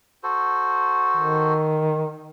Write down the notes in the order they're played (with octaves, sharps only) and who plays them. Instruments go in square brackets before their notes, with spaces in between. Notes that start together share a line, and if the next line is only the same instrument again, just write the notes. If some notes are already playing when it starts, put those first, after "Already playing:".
[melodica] F#4 A4 C5
[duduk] D#3